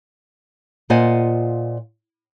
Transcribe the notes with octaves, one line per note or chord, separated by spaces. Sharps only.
A#2 F4 C5 D#5 F#5 G#5